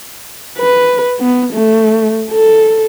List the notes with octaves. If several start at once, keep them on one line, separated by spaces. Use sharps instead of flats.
B4
B3
A3
A4